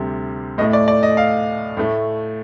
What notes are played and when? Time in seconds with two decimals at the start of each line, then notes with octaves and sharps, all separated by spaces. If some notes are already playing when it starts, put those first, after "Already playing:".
Already playing: D2 C3 G3
0.58 A2 A3 D#5
0.73 D5
0.88 D5
1.03 D#5
1.17 F5
1.77 A2 A3